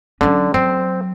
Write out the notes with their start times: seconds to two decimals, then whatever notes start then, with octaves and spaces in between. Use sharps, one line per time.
0.21 D3 F#3 C#4
0.54 F#3 C4